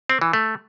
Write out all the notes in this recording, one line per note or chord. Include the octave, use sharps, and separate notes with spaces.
C4
E3
A3